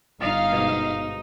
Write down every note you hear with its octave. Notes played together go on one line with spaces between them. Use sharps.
G1 D#4 F4 F5
G#2 B2